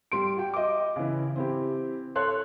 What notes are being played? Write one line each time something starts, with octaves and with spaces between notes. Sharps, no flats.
G3 C6 D7
F#4 G5
D#5 D6
C#3 E3
C4 E4 G4
A4 C#5 C6 F#6